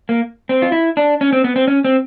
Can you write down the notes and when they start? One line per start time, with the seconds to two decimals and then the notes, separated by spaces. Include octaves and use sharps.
0.09 A#3
0.49 C4
0.62 F4
0.72 E4
0.97 D4
1.21 C#4
1.33 C4
1.44 B3
1.56 C4
1.68 C#4
1.84 C4